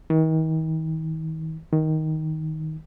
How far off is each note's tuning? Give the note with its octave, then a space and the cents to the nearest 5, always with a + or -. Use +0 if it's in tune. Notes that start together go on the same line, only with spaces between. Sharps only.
D#3 +40
D#3 +10